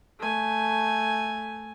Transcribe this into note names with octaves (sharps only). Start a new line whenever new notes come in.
A3 G#5